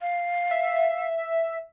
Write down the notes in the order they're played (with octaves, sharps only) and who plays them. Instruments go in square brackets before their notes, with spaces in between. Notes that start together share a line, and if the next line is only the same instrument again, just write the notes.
[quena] F5
[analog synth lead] E5